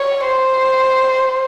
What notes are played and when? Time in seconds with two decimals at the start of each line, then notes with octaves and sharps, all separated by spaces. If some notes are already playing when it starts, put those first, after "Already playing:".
Already playing: C#5
0.26 C5